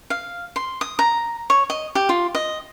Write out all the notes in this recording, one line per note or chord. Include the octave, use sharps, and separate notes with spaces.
F5
C6
D#6
A#5
C#5
D#5
G4
F4
D#5